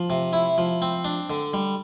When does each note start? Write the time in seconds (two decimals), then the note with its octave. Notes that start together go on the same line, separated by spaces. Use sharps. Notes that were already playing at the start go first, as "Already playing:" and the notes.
Already playing: F3
0.10 C3
0.33 E4
0.58 F3
0.82 C4
1.05 D4
1.30 D3
1.54 G3